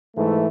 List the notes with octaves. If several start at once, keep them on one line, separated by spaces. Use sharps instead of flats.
G#2 E3 A3